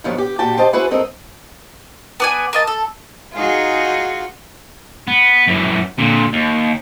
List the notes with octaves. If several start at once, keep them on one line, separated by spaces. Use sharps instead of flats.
G2 B2 D#3 F3 F#3 B3
G4
A#2 F#4 G4 G5 A5
G4 C5 D#5 A5
E4 F#4 G#4 B4 C5
G2 C4 A4 A#4 D#5
B3 D5 G#5
A#3 D#5 A5
A4
D#4 F4 F#4 G#4
B3
F#2 E3
A#2 D3
D#2